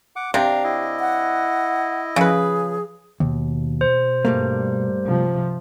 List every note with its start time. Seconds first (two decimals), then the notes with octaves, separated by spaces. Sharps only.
0.16 F#5 D6
0.34 C3 D4 G4 F5 A#5
0.64 E4 D#5
1.00 F#5
2.16 C#3 F3 G#4 B4
3.20 D#2 B2
3.81 C5
4.25 G2 G3 A3 A#3
5.03 C3 F3